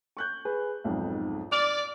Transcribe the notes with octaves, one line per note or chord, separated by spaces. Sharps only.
C#6 F#6 G6
G#4 B4
B1 F2 G#2
D5 F6 F7